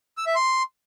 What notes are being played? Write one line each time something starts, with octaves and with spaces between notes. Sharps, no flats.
E6
E5
C6